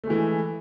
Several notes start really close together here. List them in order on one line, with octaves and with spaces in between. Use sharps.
A3 G#3 E3